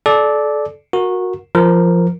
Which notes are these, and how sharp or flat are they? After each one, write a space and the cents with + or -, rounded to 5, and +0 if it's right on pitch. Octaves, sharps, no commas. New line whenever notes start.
A4 -30 D5 +0
F#4 -20 A#4 +0
F3 -10 A#4 +0